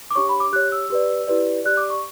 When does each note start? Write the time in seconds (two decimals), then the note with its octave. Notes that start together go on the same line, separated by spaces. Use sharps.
0.11 D6
0.15 D4 G4 C#5 C#6
0.29 B5
0.40 D6
0.53 G4 C#5 F#6
0.72 E6
0.90 G4 B4 D5
1.28 E4 G4 B4 D5
1.65 G4 D5 F#6
1.77 D6
1.90 C#6